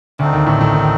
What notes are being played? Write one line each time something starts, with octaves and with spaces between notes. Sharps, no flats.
D2 D3 A3 C4 D#4
D#2 D#3
A1 A2
A1 A2
D#3